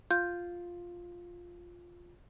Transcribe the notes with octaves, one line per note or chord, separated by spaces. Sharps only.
F4 G6